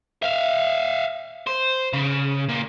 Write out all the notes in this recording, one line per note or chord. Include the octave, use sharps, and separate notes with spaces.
E5 F5
C5
C#3
A#2